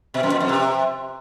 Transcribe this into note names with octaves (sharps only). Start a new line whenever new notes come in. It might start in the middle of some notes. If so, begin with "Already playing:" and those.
B2
F#2
A#2
F2
C3